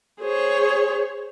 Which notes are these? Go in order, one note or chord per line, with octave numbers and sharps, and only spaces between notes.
G#4 C5 C#5